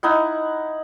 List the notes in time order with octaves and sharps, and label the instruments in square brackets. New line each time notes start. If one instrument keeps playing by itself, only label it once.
[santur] D#4 E4 F#5